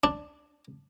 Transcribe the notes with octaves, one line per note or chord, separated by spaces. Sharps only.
D4